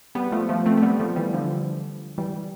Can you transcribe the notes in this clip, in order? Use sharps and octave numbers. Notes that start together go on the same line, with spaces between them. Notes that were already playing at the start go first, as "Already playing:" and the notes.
G3 B3
F3 A3
F3 A3
A3 C4
A3
G3 B3
F3 A3
E3 G3
D3 F3
E3 G3